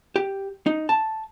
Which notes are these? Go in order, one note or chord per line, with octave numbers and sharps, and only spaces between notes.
G4
D#4
A5